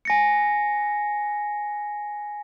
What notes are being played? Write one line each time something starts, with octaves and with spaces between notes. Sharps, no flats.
G#5 A#6 C#7